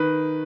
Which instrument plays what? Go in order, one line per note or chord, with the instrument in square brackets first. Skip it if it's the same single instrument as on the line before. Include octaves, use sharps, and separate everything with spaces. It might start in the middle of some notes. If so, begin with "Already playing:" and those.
Already playing: [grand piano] D#3 B4